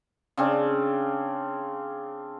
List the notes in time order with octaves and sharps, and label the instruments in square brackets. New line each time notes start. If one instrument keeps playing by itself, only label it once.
[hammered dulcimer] C#3 C4 D4